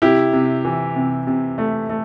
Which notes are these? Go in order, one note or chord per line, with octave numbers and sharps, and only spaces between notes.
C3 E4 G4
C3
E3
C3
C3
A3
A3